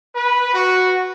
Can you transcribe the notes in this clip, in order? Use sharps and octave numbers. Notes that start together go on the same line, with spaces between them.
B4
F#4